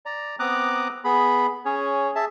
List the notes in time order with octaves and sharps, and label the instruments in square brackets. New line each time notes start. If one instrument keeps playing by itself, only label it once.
[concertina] D5 A#5
B3 C4 A#5 D6 D#6 F#6
B3 G#4 B5
C#4 G#4 C#5
G#4 E5 A5